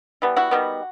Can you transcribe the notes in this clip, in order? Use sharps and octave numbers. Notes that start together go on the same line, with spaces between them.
E3 G3 B3
E4 F#4
D#3 G3 B3